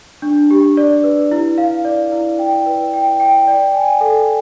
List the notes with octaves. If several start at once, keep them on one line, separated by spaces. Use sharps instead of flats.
D4
G4
D5
B4
E4
F5
D5
E4
G5
B4
G5
G5
D5
G#5
A4